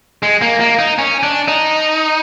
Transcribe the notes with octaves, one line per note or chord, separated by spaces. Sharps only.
G#3
A#3
A#3
D#4
C#4
D4
D#4